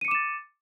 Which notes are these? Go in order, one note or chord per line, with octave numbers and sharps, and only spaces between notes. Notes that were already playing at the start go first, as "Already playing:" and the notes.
D6 A6 C#7 D#7 E7